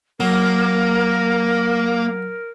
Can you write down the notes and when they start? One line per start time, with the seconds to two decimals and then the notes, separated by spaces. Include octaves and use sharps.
0.20 F#3 A#3 A#4